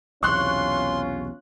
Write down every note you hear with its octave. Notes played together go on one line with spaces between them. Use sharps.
B1 E2 C3 C#4 F4 C6 C#6 F#6